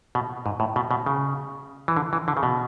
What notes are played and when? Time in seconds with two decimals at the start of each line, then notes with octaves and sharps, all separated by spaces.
0.15 B2
0.46 G#2
0.60 A2
0.76 B2
0.91 B2
1.06 C#3
1.88 E3
1.97 D3
2.13 E3
2.28 D3
2.37 C#3
2.43 B2